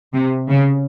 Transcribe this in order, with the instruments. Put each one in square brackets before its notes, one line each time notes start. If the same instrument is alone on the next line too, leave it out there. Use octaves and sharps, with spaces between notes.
[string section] C3
C#3